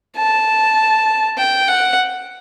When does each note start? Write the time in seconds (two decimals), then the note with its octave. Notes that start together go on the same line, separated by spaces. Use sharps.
0.16 A5
1.38 G5
1.68 F#5